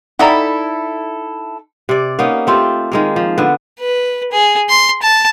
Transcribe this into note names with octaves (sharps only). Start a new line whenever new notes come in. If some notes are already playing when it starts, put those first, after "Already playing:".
D#4 E4 A4 D5 F#5 A#5 B5
C3 D5
A#3 B3 C#4 D#4
A3 C4 F4 G4
D#3 G#3 A#3
F3
D3 B3
B4
G#4
C6
A5